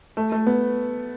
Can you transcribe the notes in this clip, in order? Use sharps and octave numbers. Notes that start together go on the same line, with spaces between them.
A3
A3
B3